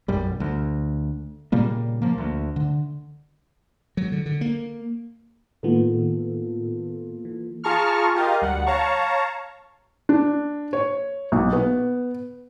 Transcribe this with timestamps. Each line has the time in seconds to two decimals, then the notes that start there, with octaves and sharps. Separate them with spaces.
0.08 B1 F#2 G3
0.40 D2
1.52 A#2 C#3 G3 A#3
2.02 F3 A#3
2.18 D2
2.56 D3
3.97 F#3
4.12 D3
4.26 D3
4.41 A#3
5.63 A2 D#3 A#3 B3 F4 A4
7.25 E3
7.64 F4 G#4 A5 A#5 C#6 F6
8.15 F4 G4 A#4 D#5 F5
8.42 D2 G3 F#5
8.67 C#5 F5 A5 A#5 C#6
10.09 D4
10.73 C#5
11.32 B1
11.53 B3